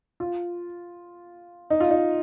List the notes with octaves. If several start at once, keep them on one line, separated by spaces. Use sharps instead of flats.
F4
D#4
F4
D#4